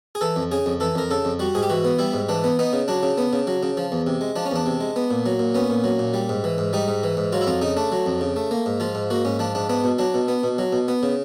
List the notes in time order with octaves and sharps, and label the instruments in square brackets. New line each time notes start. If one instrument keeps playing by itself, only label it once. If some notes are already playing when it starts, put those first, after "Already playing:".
[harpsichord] G#4
E3 A4
F2
C#3 G#4
F2
E3 A4
F2 A#4
C#3 A4
F2
G3 F#4
G#2 G#4
G4
E3 F#4
B3
G3 E4
G#2
E3 D4
B3
B3 D#4
C#3
F#3 D4
C#3
B3
C#3
F#3
C#3
F3
E2
C3
G#3
F3 D4
C#4
E2 D4
C3
G#3
B3
A#2
F#3
A#2
B3 C#4
A#2
F#3
A#2
G3
G#2
E3
G#2
G3 D#4
G#2
E3
G#2
F#3 F4
E4
F2 F4
C#3 D#4
A3 D4
F#3
F2
C#3
A3
A#3
G#2
F3 F4
G#2
A#3 F#4
G#2 C#4
F3 D4
G#2 D4
B3 D4
B2
F#3 D4
B2
B3
B2
F#3
B2
B3
C#3